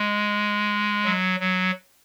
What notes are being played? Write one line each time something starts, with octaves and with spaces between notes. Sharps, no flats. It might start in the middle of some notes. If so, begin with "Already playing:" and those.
Already playing: G#3
F#3
F#3